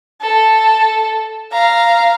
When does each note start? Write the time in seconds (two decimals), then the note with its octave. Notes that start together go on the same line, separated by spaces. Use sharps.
0.21 A4
1.52 F5 A#5